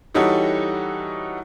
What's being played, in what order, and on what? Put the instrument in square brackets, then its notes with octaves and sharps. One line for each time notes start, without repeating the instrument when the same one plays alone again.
[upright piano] E3 G3 D#4 F#4 A4 C#5